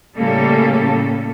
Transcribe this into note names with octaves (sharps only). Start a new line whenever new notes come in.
A2 C#3 G3 A#3 C#4 A4